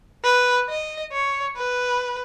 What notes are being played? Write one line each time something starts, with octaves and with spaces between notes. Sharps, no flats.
B4
D#5
C#5
B4